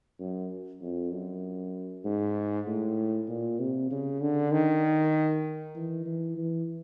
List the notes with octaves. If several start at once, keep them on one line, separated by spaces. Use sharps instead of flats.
F#2
F2
F#2
G#2
A2
A#2
C3
C#3
D3
D#3
E3
E3
E3